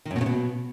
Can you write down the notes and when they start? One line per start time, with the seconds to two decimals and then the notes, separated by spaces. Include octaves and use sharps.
0.05 D#3
0.11 F#2
0.16 B2
0.21 C#3
0.26 B2